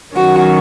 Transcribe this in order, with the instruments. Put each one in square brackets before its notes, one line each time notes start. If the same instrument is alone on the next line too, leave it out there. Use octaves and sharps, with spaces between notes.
[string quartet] D#3 F#3 C#4 F#4